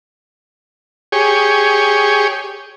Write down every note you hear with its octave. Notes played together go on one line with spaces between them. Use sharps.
G4 G#4 C#5